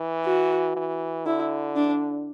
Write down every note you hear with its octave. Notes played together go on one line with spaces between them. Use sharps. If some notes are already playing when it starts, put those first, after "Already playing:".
Already playing: E3
F#4
E3
D3 E4
D4